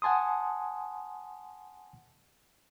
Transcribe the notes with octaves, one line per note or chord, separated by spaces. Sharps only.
F#5 G#5 A5 C6 D#6